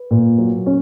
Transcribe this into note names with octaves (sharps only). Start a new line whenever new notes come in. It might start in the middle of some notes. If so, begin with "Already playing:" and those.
Already playing: B4
A#2
F#3
C#4